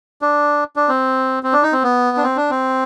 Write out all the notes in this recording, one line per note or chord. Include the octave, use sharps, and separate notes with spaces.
D4
D4
C4
C4
D4
D#4
C4
B3
D4
C4
D4
C4